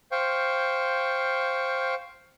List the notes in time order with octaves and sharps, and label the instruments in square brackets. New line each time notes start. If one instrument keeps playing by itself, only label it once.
[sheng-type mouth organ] C5 F5 G5 C#6